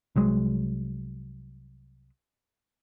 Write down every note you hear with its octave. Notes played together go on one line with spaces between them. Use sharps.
C2 F#3 G#3